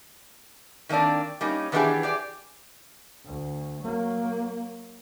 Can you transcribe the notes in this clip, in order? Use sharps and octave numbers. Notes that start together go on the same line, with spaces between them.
D#3 A#3 C4 D4 D5
G3 A#3 C#4 D#4
D#3 E3 B3 D4 G4 G#4
G4 G#4 D5
D2
F#3 A#3